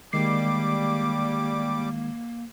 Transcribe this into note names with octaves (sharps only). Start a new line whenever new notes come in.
D#3 G3 G#3 A#3 D6 C7